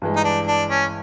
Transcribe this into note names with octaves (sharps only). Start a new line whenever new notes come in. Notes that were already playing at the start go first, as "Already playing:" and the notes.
G2 E3 G#3
D#4
D4
D4
C#4